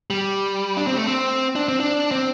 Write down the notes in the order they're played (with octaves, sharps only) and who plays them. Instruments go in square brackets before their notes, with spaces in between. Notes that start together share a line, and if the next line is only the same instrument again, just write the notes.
[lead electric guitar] G3
D4
C4
A3
C4
D4
C4
D4
C4